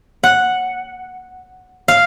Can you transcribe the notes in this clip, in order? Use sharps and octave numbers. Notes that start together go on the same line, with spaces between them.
F#5
F5